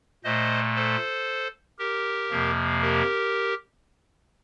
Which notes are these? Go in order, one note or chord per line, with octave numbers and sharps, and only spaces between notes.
A#2 A3 C5 D#5
A4 C5
G4 A#4
F2 C3 F3 A#3
G4 A#4